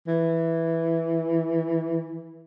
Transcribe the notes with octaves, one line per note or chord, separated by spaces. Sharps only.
E3